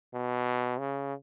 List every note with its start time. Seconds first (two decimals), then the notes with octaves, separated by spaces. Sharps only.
0.14 B2
0.79 C#3